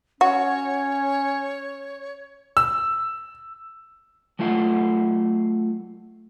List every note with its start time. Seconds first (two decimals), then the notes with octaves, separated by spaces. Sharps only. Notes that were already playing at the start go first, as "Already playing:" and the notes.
0.21 C#4 F#4 C#5
2.57 E6
4.39 F#3 A3 F4 A4 F5 F#5